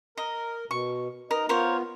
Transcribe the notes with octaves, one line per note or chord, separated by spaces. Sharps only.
A#4 D#5
B2 C#6
D#4 A#4 D#5
B3 F4 A#4 C5 C#5